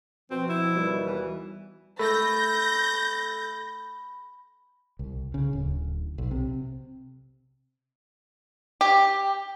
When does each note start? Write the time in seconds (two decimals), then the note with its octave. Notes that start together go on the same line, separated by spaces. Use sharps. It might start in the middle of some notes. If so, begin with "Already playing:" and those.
0.31 B2 F3 C4
0.49 E4
0.75 D#2 B2 G3
1.05 E3
1.99 A3 B5 G6 A#6
4.99 C2
5.34 C#3
5.53 D1
6.18 B1
6.31 C3
8.81 G4